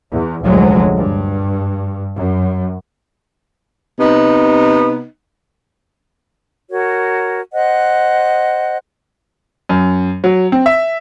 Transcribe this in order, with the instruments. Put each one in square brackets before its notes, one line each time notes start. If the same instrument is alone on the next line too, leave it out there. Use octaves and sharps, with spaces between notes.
[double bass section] E2
F1 D2 A#2 F3 F#3 G#3
G2
F#2
[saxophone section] C3 B3 D#4
[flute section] F#4 A#4 C#5
C5 D#5 F#5 F#6
[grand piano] F#2
F#3
C4
E5